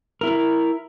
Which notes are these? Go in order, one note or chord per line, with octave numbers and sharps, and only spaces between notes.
E4 A#4